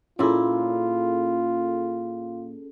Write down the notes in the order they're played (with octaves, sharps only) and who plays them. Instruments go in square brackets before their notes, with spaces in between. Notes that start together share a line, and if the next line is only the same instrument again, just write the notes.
[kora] A#2 E4 [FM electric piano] C#4 G#4 A4 [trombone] F4